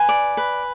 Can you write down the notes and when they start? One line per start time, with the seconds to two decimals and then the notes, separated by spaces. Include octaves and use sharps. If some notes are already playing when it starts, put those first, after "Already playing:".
Already playing: B4 G#5
0.09 D5
0.37 B4